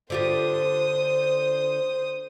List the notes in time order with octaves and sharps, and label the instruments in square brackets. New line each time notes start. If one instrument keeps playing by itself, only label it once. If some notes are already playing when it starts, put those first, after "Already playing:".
[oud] D3 F4 G4 [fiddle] C5 D#6